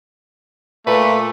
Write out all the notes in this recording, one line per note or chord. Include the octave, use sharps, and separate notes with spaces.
A#2 A3 B4